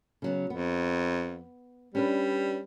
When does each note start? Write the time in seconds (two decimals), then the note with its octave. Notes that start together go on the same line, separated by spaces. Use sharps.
0.22 C#3 F#3 B3
0.50 F2 B3
1.95 G3 C#4 D4 B4